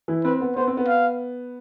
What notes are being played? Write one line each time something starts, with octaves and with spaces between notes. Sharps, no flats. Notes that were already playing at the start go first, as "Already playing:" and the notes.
E3 E4
C4 B4
B3
B3 C5
C4
B3
F5